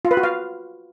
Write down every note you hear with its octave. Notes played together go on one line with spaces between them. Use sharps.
F4
B4
F#4
F5